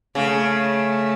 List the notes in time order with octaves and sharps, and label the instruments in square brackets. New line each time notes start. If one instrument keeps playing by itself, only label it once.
[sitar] C#3 [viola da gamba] A3